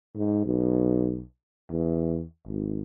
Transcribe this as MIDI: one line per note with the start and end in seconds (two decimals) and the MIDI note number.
0.16 0.45 44
0.45 1.23 35
1.71 2.23 40
2.47 2.83 32